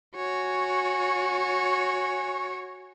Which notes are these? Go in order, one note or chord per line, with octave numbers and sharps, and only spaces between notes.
F#4 C#5 G#5